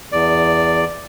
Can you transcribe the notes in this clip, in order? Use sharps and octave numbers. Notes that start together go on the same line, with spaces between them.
E2 D5